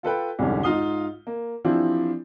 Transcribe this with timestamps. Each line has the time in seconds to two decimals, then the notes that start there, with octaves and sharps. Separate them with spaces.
0.03 F4 A4 B4 G5
0.39 C2 F2 G#2 D3 C#4 G4
0.63 G#2 D#4 F4 F5 D#6 G7
1.27 A#3
1.64 E3 F3 C4 D4 E4 G4